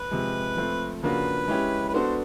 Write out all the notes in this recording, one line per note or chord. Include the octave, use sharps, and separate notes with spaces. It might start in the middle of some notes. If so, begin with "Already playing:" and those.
Already playing: B4
C3 F3 G#3
F3 A3 C4
C#3 F3 A#3 D4 F#4 B4
G#3 C#4 E4 G4
B4
B3 D4 F#4 A4 C5